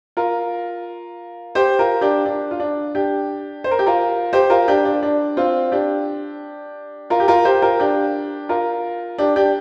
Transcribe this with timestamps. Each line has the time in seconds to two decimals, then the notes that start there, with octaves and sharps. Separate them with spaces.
0.17 F4 A#4
1.55 G4 C5
1.79 F4 A#4
2.01 D4 G4
2.26 D4
2.51 F4
2.60 D4
2.95 D4 G4
3.64 C5
3.71 A#4
3.79 G4
3.86 F4 A#4
4.33 G4 C5
4.50 F4 A#4
4.68 D4 G4
4.85 D4
5.03 D4
5.37 C4 F4
5.72 D4 G4
7.10 F4 A#4
7.20 G4
7.28 F4 A#4
7.45 G4 C5
7.62 F4 A#4
7.80 D4 G4
8.49 F4 A#4
9.18 D4 G4
9.36 D4 G4